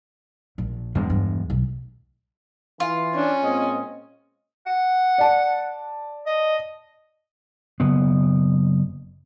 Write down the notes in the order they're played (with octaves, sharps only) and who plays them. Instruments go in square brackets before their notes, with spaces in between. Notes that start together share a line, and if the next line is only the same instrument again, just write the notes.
[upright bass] A#1
[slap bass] E2 G#3 [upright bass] G2
[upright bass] G2
B1
[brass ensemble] E3 [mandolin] F4
[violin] C#4 [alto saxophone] D4
[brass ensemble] A#2 G#3 C4 [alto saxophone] D#5
[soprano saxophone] F#5
[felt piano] D5 A5
[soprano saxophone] D#5
[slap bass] F#1 B3